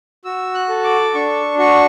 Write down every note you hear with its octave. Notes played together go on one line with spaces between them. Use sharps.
F#4 E6
F#6
A4
D6
D4 C#6
F#4 C#6